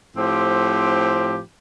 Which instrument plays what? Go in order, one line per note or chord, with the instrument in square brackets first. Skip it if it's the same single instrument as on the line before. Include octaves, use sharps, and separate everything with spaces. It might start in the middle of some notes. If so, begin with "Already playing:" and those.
[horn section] A2 F3 C4 G4